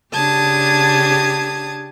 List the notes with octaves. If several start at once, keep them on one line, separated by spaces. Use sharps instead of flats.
C#3 D4 G4 A5 D#6 G#6